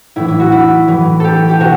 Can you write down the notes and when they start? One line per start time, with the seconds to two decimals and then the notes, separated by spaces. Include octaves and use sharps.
0.16 A2 E3 E4
0.28 E4
0.40 F#4
0.52 E4
0.88 A2 E3
1.20 G4 A4
1.49 G4
1.60 B2 F#4